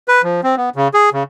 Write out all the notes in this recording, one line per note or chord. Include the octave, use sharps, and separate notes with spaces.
B4
F3
C4
B3
C#3
G#4
C#3